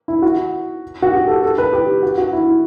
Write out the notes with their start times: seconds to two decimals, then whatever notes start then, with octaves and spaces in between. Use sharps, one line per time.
0.08 E4
0.22 F#4
1.02 F#4
1.12 G4
1.27 A4
1.42 A4
1.58 B4
1.73 G4
2.02 F#4
2.18 F#4
2.33 E4